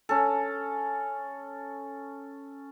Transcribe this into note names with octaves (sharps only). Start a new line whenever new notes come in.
C#4 A4